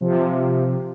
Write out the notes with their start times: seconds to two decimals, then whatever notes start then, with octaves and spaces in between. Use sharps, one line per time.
0.01 C3 F3